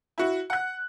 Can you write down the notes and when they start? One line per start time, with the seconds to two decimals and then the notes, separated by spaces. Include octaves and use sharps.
0.18 E4 F#4
0.50 F#5 F#6